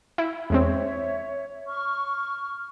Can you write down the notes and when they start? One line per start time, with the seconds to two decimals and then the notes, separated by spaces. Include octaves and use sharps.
0.18 E4
0.50 E2 G#3 C4 C#5 E5
1.67 C#6 F6